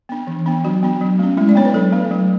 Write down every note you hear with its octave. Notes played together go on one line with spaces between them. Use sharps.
B3 D4
E3
B3 D4
F#3 F#4
B3 D4
F#3
A3 C#4
G#3 E4
D5
B3 D4 C#5
B4
F#3 A4
A3 D4
F#3